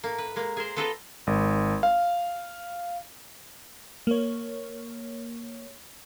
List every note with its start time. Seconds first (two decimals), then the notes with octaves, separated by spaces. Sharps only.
0.04 A2 A#3
0.18 B4
0.36 G#3 A#3
0.57 G#4 A#4 C5
0.77 B3 F4 A4 B4 D#5 A#5
1.27 G#1
1.83 F5
4.07 A#3 C#5